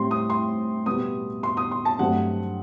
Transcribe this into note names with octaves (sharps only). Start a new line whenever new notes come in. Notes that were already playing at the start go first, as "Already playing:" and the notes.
Already playing: A2 G3 C4 C6
D#6
C6
B2 G3 B3 D#6
C6
D#6
C6
A5
G2 F#3 A3 C4 F#5